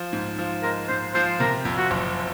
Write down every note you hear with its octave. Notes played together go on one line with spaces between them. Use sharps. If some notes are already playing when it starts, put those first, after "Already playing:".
Already playing: F3
G#2
F3
G#3 A#4
G#2 C5
F3 C5
C3 A#4
F2
F#4
F#1